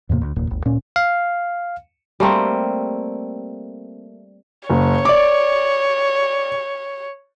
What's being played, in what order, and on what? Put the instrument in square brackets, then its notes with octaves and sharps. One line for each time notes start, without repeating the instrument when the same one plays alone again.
[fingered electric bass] E2 A2 C3 A#3
D2
F1 D#2 A#2
G1 D2
D1 A#2 C#4
[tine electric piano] F5
[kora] G3 A3 A#3 C4
[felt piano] F#1 [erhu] C#5
[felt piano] D5 D6